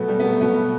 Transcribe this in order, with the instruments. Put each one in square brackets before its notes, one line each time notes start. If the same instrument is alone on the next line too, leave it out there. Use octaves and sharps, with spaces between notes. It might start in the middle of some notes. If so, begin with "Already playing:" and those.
Already playing: [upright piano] B2 F#3 A3 B3
G3
B3
A3
B2 F#3 B3